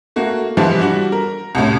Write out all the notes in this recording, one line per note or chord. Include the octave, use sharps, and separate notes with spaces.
A3 A#3 F#4
G#2 E3 F3 G3
G3 D4 F#4
A#4
C2 F#2 A2